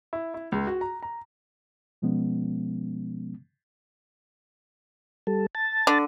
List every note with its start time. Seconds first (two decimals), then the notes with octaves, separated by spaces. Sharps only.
0.13 E4
0.34 E4
0.52 C#2
0.67 F#4
0.81 A#5
1.03 A#5
2.02 B2 F3 G#3 B3 C#4
5.27 G3 A4
5.55 A5
5.87 D3